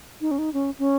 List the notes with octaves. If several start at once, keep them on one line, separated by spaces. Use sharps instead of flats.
D#4
C#4
D#4
C#4
C#4